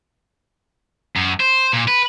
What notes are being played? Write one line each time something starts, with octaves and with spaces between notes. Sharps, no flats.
F#2
C5
A#2
B4